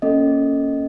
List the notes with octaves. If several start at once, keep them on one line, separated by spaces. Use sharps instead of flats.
A#3 C#4 A4 D#5